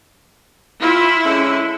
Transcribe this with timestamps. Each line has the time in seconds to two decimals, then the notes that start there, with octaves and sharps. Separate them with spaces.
0.82 E3 E4 F4
1.24 D3 G#3 C#4